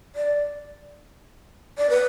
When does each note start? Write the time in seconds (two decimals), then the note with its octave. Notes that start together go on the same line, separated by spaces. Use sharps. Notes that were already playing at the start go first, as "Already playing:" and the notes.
0.15 D5
1.78 D5
1.90 B4